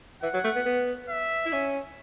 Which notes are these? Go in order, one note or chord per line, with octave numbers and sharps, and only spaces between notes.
E3 F#5
F#3
A3
B3
B3
E5
E4
C#4